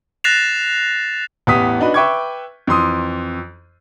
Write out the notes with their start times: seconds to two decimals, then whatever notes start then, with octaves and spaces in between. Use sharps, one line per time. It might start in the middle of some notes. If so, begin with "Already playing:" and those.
0.24 F#6 A6 A#6 C7 E7 F7
1.47 A1 E2 B3 G4 D#6 B6
1.80 D4 D#4 F#4 B4
1.94 B4 E5 G5 C#6 D6 G#6
2.67 F2 E3 C6 D#6